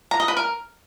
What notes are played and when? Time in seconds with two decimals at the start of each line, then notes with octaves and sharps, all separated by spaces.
0.11 A#5
0.20 D#5
0.28 B4
0.37 A#4